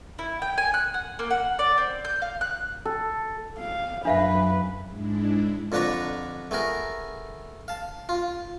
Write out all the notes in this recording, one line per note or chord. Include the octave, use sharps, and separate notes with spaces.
E4
G5
G#5
F#6
F#5
A#3
F#5
D5
C4
G6
F5
F#6
A4
F5
F#2 D4 B4 E5 F5
G#2 G#3 D4 E4
F2 D3 D4 B4 A#5 C#6
A3 B3 G#4 A#4
F5 A5
F4